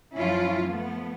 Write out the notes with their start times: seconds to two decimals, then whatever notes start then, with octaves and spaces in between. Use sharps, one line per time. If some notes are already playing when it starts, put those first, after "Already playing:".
0.16 F#2 F3 C#4 E4 F4
0.66 F3 A3 B3